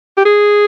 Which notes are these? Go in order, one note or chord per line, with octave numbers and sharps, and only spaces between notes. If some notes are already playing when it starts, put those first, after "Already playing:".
G4
G#4